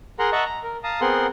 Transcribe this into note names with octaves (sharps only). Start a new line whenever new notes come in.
G#4 A#4 F#5 A#5 C6
D#5 E5 F#5 A5 A#5 C#6
A#5
A#4
F5 A5 A#5 D#6
B3 C4 G#4 A#4 F#5 C6